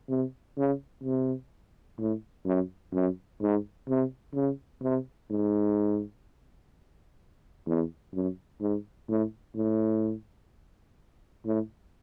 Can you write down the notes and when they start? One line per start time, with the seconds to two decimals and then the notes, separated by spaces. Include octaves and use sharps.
0.09 C3
0.57 C#3
1.04 C3
1.99 A2
2.46 F#2
2.94 F#2
3.41 G#2
3.89 C3
4.35 C#3
4.83 C3
5.30 G#2
7.67 E2
8.14 F#2
8.61 G#2
9.09 A2
9.56 A2
11.45 A2